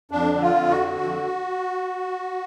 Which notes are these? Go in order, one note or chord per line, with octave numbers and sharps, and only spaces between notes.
F2 D4
D3
F4
F2
F#4
D3
F2